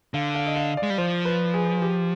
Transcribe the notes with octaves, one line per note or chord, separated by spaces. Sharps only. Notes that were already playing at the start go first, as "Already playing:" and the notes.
D3 F5
F5
D#5
F5
D5
G#3
G3
F3 C5
B4
G#4
G4